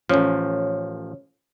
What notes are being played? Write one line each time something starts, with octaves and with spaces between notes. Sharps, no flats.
A1 F3 C#4 C#5